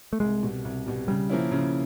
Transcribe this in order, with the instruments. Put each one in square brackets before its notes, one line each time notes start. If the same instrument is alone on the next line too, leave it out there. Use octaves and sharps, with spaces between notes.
[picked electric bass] A3
[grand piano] C2 [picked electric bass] G#3
[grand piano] B2 G3
C2
B2 G3
[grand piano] C#3 [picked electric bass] G3
[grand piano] F3 A#3 C#4 E4
C#3